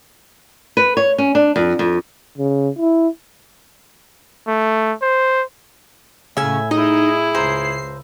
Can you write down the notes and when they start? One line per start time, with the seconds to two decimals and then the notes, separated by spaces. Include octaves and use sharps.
0.77 B4
0.97 C#5
1.18 C#4
1.35 D4
1.56 F2
1.79 F2
2.38 C#3
2.79 E4
4.47 A3
5.02 C5
6.37 A2 C#3 E5 G#5
6.71 D#4 E4 G#4 D#5
7.35 C#2 C5 A#5 C7